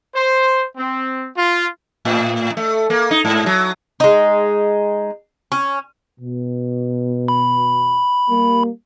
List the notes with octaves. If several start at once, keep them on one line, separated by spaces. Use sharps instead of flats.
C5
C4
F4
A2
A3
A#3
D#4
G#2
F#3
G#3 D#4
C#4
B2
B5
G3 A#3